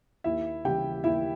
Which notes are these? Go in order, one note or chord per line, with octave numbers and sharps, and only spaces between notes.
D#2 E4 E5
C#3 E3 G3 G4 G5
D#2 E4 E5